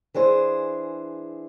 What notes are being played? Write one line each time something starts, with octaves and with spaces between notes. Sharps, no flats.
E3 D4 G#4 C5